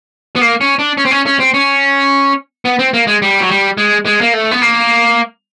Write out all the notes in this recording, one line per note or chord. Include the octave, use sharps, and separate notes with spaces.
B3
A#3
C#4
D4
C#4
C4
C#4
C#4
C4
C#4
B3
C4
A#3
G#3
G3
F#3
G3
G#3
G#3
A#3
A3
B3
A#3